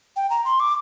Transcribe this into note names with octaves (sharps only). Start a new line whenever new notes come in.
G5
A#5
C6
D6